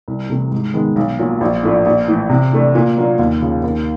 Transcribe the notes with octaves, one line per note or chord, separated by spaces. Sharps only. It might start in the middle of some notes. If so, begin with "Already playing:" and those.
C2
C3 E3 A3
G#2
D#3 G#3 B3
B1
A#2 F#3
A#1
A2 F3 A3 D4
A#1
A2 E3
C3
E3 A3 D4
A#2
F#3 A#3 D4 F4
D#2
C#3 F3
D#2